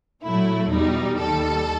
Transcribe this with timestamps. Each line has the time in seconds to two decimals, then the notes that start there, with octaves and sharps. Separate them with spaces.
0.23 A#2 F#3 A3 E4
0.71 E2 B2 G3 D#4
1.19 D#2 D#3 G3 A4